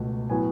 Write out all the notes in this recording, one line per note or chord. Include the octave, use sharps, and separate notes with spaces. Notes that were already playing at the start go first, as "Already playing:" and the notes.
Already playing: C#2 B2 A3
A2 F#3 B3 G#5